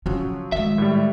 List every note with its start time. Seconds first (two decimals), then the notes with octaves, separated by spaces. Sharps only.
0.06 C#3 F3 F#3 C#4
0.52 D#3 G#3 E5
0.78 A2 G3